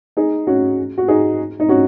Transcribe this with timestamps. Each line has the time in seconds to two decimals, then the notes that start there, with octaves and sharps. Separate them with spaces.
0.17 D#4 G#4
0.47 C#4 F#4
0.98 F#4
1.08 D#4 G#4
1.60 D#4
1.69 C#4 F#4